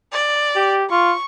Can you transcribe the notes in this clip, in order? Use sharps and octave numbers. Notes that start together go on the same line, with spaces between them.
D5
G4
F4 C#6